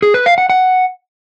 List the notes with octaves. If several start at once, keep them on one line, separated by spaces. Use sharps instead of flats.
G#4
B4
F5
F#5
F#5